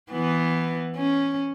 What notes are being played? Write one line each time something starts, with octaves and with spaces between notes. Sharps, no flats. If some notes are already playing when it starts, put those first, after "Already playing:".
E3 B3
C#4